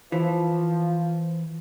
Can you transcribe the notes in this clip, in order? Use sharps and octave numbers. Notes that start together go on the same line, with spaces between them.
E3 F3